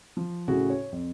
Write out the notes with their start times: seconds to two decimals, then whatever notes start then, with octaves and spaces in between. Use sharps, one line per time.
0.17 F3
0.48 A2 C#3 C#4 F#4
0.70 C#5
0.92 F2